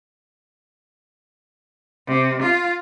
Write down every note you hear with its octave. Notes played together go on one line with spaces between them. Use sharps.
C3
F4